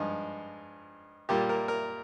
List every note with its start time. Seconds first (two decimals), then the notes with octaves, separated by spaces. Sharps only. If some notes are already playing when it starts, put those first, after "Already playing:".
Already playing: G2 F3 G#3 D#4
1.29 A#2 G3 A#3 G4
1.49 A#4
1.68 A#4